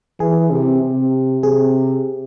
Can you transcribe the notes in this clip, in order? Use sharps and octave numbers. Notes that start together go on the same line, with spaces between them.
E3 G#4
C3
C3
C3 G#4